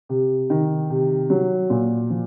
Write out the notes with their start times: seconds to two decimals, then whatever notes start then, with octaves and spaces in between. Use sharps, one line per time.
0.09 C3
0.50 D#3
0.90 C3
1.30 F#3
1.70 A#2
2.10 F3